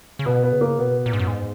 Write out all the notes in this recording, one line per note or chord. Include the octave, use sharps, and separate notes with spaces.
C#3
B2 B3
B3
C#3
A#3
B2 B3
A#2
G#2
F#2
G#2